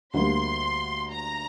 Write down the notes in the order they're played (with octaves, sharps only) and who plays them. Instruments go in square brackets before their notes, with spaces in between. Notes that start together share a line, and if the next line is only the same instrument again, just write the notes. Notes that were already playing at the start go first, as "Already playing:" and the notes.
[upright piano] D2 D3 G3 A#3 D4 [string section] C6
[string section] A#5